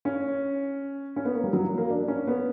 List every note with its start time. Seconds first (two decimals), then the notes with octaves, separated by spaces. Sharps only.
0.05 C#4
1.16 C#4
1.25 B3
1.34 A#3
1.43 G3
1.53 F#3
1.78 A#3
1.90 D4
2.08 C#4
2.27 B3